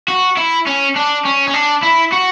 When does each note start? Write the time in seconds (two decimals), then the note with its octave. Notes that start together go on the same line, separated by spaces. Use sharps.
0.08 F#4
0.37 E4
0.67 C#4
0.96 D4
1.25 C#4
1.48 C#4
1.54 D4
1.83 E4
2.12 F#4